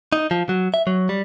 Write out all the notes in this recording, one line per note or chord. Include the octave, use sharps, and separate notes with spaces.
D#4
F3
F#3
E5
F#3
G3